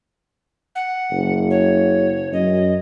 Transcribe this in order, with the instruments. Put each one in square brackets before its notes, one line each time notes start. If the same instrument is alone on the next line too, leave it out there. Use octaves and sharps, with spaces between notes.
[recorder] F#5
[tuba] F#1
[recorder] C#5
[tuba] F#2 [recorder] D#5